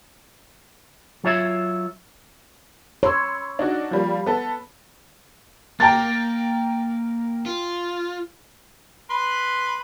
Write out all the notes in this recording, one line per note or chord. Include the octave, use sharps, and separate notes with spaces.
F#3 F4 C#5 E5
C#5 B5 C6 E6
D4 D#4 F#4
F3 G3 A#3
B3 A4
A#3 G5 A#5 A6
F4
B4 B5 C6